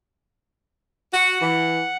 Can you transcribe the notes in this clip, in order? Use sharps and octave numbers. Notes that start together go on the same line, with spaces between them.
F#4 F#5
E3